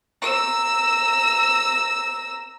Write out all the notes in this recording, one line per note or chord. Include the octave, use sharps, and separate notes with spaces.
A#5 E6